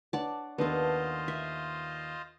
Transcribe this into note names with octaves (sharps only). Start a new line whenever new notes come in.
D4 C#5 D5 F#5 A5
D#2 B3 D4 F4 A4 B4 C5 D#5
E5